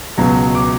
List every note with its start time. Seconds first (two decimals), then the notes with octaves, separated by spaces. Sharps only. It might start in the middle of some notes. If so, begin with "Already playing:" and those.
0.18 C#2 B2 F#3
0.55 D6